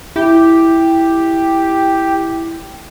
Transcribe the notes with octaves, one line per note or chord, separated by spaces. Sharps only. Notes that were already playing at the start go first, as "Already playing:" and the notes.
E4 G4